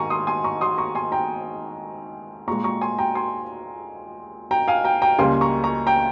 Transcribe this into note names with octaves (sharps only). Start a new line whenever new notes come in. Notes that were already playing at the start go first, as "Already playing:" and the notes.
Already playing: G#2 D#3 G#3 G#5 A#5 C#6
C6 D#6
G#5 C6
A#5 C#6
C6 D#6
A#5 C#6
G#5 C6
G5 A#5
A#2 G#3 A#5 C#6
A#5 C#6
G#5 C6
G5 A#5
G#5 C6
G5 A#5
F5 G#5
G5 A#5
G5 A#5
C#2 C#3 G3 A#3 G#5 C6
A#5 C#6
A#5 C#6
G5 A#5